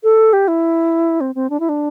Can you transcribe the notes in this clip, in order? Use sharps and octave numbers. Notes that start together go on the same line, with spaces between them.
A4
G4
E4
C4
C4
D4
E4
D4